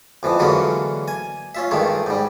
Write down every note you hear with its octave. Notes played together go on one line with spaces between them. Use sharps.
F2 E3 F3
D3 E3 F#3 G#3 A#3 C#4
G#5
C#4 F4 E5
G2 D#3 G#3 A3
G#2 G3